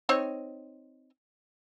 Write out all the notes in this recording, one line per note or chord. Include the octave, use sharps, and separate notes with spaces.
C4 D#4 C#5